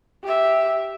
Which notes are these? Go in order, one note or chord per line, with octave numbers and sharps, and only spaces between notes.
G4 E5